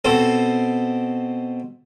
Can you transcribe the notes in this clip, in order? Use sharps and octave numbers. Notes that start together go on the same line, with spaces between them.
B2 C4 A4